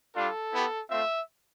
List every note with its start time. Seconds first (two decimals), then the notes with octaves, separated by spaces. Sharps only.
0.15 G3 D4 F4 A4
0.52 B3 E4 G4
0.89 A3 C4 F4 E5